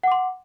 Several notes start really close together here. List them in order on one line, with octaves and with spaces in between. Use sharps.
F#5 D6 C6